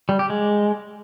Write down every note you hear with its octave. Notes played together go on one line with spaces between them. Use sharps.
G3
G4
G#3